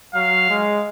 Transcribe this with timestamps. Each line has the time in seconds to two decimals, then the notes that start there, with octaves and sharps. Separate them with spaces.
0.14 F#3 F5
0.50 G#3